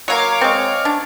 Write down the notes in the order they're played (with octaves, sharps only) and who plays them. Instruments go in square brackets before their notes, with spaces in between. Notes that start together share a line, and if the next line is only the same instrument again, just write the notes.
[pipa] F#3 A#3 A#4 [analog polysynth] C#5 F5 D6
[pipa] G#3 C4
D4